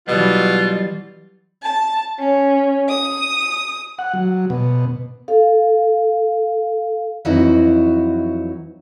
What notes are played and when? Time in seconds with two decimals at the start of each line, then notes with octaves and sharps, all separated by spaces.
0.08 B2 E3 F#3 G3 F4
1.63 A5
2.19 C#4
2.89 D#6
3.99 F#5
4.14 F#3
4.50 B2
5.28 A4 F5
7.25 F2 E3 F#3 D#4 E4 F#4